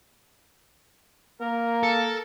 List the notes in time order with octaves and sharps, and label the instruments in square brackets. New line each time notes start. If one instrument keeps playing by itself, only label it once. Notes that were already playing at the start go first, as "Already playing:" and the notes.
[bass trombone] A#3 [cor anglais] A#4
[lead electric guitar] A4